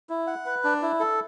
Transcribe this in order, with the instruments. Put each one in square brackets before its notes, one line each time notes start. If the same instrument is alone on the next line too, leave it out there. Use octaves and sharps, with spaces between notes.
[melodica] E4
F#5
B4
D4
E4
A4